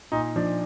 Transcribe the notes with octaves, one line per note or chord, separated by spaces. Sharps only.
A#2 D#4
F3 D4